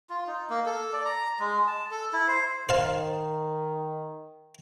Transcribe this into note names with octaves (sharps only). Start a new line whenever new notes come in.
F4
D#4
A#3
A4
D5
A#5
G#3
A5
A4
E4
C5
D#3 C5 F5 A5